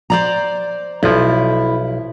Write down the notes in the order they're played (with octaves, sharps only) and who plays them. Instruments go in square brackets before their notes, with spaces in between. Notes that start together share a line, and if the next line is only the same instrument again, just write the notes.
[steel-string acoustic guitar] C5 D5 A#5
[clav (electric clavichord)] B1 F3 [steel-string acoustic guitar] E4